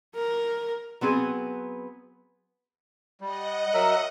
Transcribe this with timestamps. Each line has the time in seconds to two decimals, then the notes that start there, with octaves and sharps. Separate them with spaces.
0.15 A#4
1.01 F#3 B3 C4 G#4
3.21 G3 D#5 F#5
3.74 F#3 A#4 E5